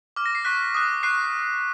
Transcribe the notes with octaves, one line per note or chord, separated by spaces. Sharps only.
D6 F6
A#6
C7
C#6 F#6 B6
D#6 F#6
C#6 F#6 C7